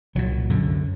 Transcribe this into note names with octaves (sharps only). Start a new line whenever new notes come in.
C2 A#2 F#3
F#2 D3